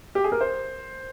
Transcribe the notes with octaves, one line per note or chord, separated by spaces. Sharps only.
G4
G#4
A#4
C5